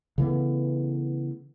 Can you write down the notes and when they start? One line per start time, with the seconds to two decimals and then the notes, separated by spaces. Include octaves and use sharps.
0.18 C#3 E3 A3 B3